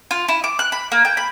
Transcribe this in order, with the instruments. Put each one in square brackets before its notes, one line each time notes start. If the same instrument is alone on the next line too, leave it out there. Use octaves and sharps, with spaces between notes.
[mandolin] F4
E4
D6
F#6
B5
A#3
G5
B5